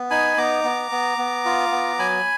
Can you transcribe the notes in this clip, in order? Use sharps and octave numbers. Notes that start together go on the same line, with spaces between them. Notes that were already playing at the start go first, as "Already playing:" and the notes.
Already playing: B3
D#4 G#5 B5
B3 A#5 D6
B3
B3
B3
F4
B3
F#3 G#5 B5